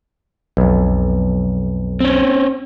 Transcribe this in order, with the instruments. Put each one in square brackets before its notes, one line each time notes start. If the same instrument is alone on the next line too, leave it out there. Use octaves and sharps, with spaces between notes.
[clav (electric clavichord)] B1 F2
[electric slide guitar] C4 C#4